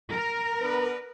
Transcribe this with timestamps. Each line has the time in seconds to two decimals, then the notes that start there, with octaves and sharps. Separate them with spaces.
0.12 A#4
0.61 B3 D4 B4